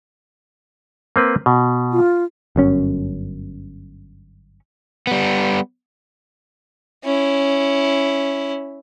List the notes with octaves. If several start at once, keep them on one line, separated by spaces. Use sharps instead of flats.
A#3 C4 B4
B2
F4
G1 F#2 C#4
G3 B3
C#4 E4